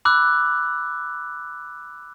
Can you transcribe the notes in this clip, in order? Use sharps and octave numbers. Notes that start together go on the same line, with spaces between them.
B5 D6 E6 F#6